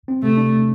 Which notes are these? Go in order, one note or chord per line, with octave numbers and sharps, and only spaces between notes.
C4
C3 A3
D4